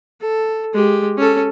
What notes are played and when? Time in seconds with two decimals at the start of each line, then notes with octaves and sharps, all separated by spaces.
0.21 A4
0.74 G#3 G4
1.18 C#4 A4